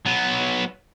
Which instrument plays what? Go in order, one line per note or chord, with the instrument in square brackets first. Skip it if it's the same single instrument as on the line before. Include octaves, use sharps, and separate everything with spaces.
[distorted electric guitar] F#3 B3